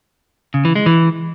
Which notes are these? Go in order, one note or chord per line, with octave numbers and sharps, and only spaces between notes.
C#3
E3
G#3
E3